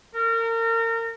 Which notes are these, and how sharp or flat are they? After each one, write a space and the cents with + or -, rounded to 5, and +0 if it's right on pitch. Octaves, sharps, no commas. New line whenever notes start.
A#4 -30